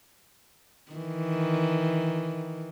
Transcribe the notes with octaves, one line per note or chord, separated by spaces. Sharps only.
D#3 E3